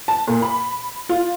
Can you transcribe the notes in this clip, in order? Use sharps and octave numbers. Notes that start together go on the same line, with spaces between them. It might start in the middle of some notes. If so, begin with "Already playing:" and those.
A5
A#2
B5
F4